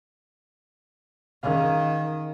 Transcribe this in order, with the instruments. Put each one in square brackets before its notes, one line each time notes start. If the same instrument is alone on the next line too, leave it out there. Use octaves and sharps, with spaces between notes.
[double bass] D#3 [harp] C#4 G#4 F5